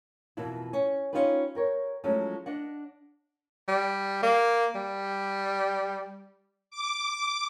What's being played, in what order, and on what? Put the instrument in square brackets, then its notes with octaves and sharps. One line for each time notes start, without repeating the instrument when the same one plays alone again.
[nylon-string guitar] F2 B2 E3 A#3 E4
C#4
C#4 D#4 F4 G4 B4
G4 A#4 C#5
F3 F#3 G#3 A3 C#4 E4
D4 D#5 F#5
[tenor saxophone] G3
A#3
G3
[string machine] D6